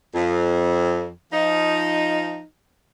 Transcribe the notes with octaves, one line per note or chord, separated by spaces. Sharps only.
F2
F3 D#4